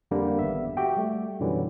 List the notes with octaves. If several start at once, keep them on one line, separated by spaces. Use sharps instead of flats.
F2 D3 G3 A#3 D4
G#1 B3 E5
F#4 G4 E5 G5
G3 A3
F#2 B2 D3 E3 F#3 G3